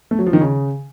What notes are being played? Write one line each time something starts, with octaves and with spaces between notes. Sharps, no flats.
A3
F#3
F3
D#3
C#3